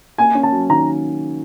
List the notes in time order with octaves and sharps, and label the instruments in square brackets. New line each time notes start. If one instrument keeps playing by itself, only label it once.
[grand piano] A#3 [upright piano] G#5
[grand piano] C#4
[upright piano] A5
[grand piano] F#3
[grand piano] D#3 [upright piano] A#5